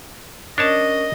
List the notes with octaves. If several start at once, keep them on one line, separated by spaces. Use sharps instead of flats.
C#4 D4 A#4 C#5 D#5 A5